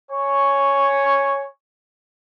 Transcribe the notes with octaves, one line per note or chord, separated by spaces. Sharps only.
C#5 G#5 C#6